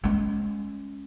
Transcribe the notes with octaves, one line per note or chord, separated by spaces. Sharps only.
G#3 C#4